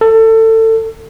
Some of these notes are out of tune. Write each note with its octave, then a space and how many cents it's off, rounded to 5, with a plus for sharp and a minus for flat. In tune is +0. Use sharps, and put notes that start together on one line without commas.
A4 +25